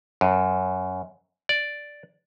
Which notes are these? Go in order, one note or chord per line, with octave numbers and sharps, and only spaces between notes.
F#2
D5